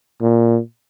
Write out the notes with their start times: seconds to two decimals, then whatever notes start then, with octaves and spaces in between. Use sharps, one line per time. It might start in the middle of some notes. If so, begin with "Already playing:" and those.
0.22 A#2